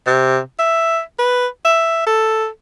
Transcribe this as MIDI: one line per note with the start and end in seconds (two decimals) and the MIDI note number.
0.07 0.39 48
0.59 1.00 76
1.19 1.47 71
1.65 2.03 76
2.06 2.47 69